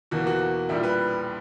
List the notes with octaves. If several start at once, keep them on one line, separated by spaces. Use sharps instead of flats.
E2 B2 A#3 F#4
F#4
A#1 A#2 G3 E4
B4